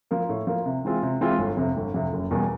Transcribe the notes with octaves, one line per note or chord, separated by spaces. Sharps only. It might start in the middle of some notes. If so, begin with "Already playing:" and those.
F3 A#3
A2
F3 A#3
C3
E3 G#3 C4 F4
C3
E3 G#3 C4 F4
G1
F2 C3
G1
F2 C3
F#1
E2 B2 G3 A#3